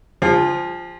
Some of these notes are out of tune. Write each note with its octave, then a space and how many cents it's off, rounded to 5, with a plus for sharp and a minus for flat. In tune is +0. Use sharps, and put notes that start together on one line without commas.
F3 +0 G#4 -45